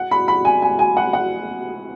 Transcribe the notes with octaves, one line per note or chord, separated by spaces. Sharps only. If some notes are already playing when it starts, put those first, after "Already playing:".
Already playing: F#5
B5
B5
G#5
G#5
G#5
F#5
F#5